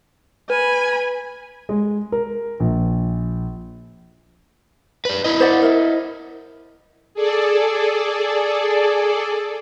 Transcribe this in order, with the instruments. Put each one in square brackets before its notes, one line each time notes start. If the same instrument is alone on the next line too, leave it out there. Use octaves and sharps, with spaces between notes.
[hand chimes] B4 [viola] G#5 B5
[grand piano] G#3
A#4
A#1
[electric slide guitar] B4 D5
E4 D#5
[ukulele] C5 D5 F#5
A#4 E5
[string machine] G#4 A4 D5